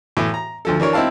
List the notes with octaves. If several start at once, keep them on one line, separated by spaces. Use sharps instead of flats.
A2 E3
A#5
D2 F3 A4
E3 D4 A#4 C#5
C4 D#4 E4 F5 A5